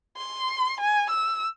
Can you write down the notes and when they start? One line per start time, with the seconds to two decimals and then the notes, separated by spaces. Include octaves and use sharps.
0.17 C6
0.80 G#5
1.10 E6